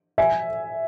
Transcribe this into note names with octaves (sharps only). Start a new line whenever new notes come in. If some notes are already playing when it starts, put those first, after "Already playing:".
E5 G#5